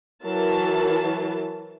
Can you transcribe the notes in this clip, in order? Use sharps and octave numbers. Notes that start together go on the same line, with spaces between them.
E3 F#3 A#4 A5